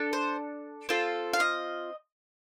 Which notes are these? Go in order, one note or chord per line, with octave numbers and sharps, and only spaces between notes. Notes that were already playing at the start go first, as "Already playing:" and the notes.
Already playing: D4 A4
C5
C4 F4 A4
F5
D#5